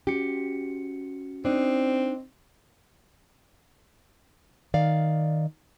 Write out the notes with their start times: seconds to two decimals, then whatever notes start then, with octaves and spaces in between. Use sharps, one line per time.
0.07 C#4 F#4 G4 C#7
1.45 C4 D4 D#4
4.74 D#3 D5 F5